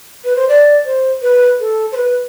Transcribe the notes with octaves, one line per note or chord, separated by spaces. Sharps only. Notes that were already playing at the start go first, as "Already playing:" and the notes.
B4
C5
D5
C5
B4
A4
C5
B4